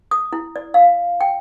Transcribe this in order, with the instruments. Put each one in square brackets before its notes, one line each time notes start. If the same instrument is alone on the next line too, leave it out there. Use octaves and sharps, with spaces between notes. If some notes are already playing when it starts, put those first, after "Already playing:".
[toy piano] D#6
E4
D5
F5
G5